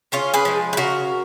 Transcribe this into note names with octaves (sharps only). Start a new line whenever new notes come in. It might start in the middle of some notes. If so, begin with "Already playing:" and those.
C#3 C#4 F4
G#4 B4
F3 G#3
B4
C#3 F#4 A#4